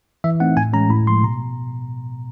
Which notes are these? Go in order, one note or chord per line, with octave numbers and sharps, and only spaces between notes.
E3 E5
A3 C4 D#4 F#5
A2 G#5
E3 G#3 C#4 A#5
A2 B5
F3 G#3 C6
B2 A#5